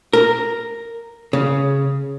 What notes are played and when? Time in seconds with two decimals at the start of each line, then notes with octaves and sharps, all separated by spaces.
0.13 A#4
1.33 C#3